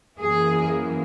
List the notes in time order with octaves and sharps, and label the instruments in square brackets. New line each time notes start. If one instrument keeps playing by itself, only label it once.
[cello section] F#2 E3 A#3 G#4